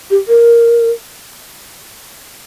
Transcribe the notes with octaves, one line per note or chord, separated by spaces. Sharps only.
G4
A#4